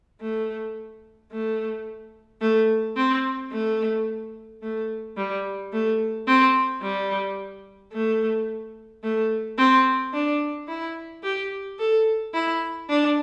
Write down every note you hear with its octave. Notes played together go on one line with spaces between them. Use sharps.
A3
A3
A3
C4
A3
A3
G3
A3
C4
G3
A3
A3
C4
D4
E4
G4
A4
E4
D4